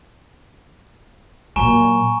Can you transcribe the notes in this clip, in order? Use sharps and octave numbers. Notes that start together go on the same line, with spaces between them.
A#2 F#3 G#5 A#5 C#6